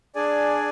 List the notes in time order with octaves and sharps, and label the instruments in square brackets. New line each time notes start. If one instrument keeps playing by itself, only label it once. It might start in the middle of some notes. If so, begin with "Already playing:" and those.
[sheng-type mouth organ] D4 G#4 D5 G#5